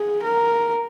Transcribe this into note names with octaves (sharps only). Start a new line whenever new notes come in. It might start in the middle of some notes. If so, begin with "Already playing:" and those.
Already playing: G#4
A#4